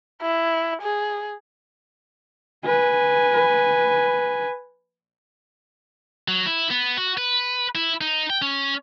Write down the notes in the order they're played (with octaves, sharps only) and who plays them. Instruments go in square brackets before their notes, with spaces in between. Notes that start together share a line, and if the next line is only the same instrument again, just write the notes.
[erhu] E4
G#4
[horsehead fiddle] B4 G#5
[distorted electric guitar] F#3
E4
B3
F#4
B4
E4
D#4
G5
C#4